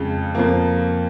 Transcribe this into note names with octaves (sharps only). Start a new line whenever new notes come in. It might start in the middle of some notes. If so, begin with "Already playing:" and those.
Already playing: F2 C#3 G#3
F2 F3 A#3